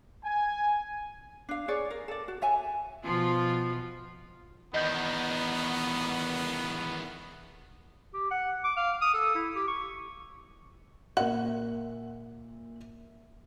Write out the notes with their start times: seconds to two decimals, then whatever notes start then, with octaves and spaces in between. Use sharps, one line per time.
0.25 G#5
1.49 D4 F5
1.68 G#4 B4 C#5 D5
1.91 A#4
2.08 A4 D5
2.28 F#4
2.42 C#5 E5 G#5
3.04 B2 F3 F4
4.74 E2 D#3 B3 D#5 G6
8.14 G4
8.31 F#5
8.64 D6
8.77 F5
9.01 D#6
9.14 A4
9.35 E4
9.55 G4
9.68 C#6
11.17 A#2 A#4 E5 F#5